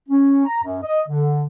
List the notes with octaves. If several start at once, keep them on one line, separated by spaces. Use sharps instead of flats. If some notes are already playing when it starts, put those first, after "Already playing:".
C#4
A#5
F#2
D#5
D3